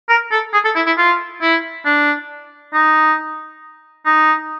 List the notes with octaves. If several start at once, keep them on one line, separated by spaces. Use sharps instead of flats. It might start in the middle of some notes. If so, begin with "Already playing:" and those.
A#4
A4
G#4
A4
E4
E4
F4
E4
D4
D#4
D#4